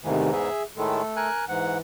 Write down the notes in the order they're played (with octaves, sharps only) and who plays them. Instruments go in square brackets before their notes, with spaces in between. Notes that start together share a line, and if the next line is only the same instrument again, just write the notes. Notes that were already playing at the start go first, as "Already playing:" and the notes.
[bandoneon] E2 G#2 E3 [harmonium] C3 D#3 A3
[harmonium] G#4 E5
[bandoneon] A2 D#3 G#3 [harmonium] A3 A4
[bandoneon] A#4 G#5 F#6
[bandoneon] G#2 F#5 [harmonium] E3